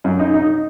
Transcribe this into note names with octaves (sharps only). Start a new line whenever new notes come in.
F#2
D#4
D#4